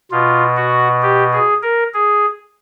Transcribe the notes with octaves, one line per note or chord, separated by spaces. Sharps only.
B2 F4
F#4
G4
G#4
A#4
G#4